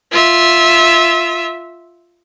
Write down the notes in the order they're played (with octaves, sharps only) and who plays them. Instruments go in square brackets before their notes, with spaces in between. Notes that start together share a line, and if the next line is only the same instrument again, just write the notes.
[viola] F4 E5